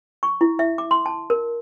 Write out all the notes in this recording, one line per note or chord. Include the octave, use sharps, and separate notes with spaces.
C#6
E4
E5
D6
C6
A5
A#4